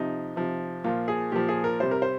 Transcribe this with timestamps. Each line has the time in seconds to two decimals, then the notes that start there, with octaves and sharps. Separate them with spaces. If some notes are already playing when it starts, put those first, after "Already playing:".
Already playing: C3 F3 D#4
0.36 C3 F3
0.84 A#2 F3 F4
1.08 G#4
1.32 A#2 F3 G4
1.49 G#4
1.64 A#4
1.80 C3 G3 C5
1.91 A#4
2.02 C5